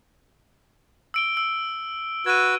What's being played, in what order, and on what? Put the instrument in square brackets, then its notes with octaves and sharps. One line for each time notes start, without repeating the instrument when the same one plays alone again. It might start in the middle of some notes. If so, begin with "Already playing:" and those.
[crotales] E6 D7 G7
E6
[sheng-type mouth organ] F#4 B4 E6 [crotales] G#6 D#7